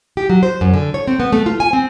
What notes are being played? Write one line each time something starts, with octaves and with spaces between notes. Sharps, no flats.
G4
F#3
C5
F#2
D3
C#5
C4
B3
A3
F4
G#5
C4